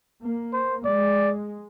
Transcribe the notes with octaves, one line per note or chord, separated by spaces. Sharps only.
A#3
C5
G#3 D5